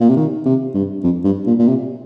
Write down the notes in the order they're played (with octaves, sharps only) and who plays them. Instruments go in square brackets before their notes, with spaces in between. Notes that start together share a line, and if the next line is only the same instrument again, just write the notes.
[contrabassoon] A#2
C3
D#3
C3
G2
F2
G2
A#2
A#2
C3